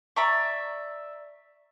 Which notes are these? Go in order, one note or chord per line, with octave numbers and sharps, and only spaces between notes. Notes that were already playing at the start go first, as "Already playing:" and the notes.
D5 E5 A#5 C#6